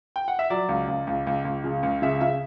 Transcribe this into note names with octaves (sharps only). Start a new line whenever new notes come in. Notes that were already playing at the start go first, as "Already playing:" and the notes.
G5
F#5
E5
F#3 D5
C#2
C#2
C#2
C#2
C#2
C#3
C#2
C#3 E5
C#3 E5